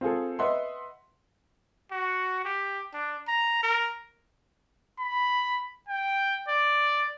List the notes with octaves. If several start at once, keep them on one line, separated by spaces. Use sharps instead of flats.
C4 F4 G#4 A4
B4 D#5 E5 F#5 C6
F#4
G4
D4
A#5
A#4
B5
G5
D5